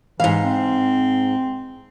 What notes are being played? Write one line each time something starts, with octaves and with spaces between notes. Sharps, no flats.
G#2 E3 F5
C4